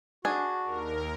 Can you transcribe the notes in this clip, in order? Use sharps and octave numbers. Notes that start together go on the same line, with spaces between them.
D4 F#4 G#4 G#5
D#2 A#4